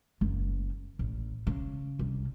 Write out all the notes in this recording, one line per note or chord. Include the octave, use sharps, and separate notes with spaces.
F#1
A1
C#3
C2